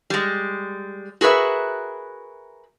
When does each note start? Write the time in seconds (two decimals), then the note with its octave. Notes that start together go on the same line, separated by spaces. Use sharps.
0.10 G3 G#3
1.21 F#4 G#4 A#4 B4 E5